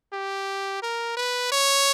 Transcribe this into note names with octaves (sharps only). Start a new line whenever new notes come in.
G4
A#4
B4
C#5